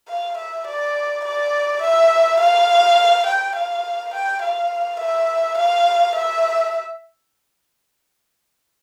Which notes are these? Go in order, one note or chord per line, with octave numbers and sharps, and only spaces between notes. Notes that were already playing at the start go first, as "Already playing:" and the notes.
F5
E5
D5
D5
E5
F5
G5
F5
G5
F5
E5
F5
E5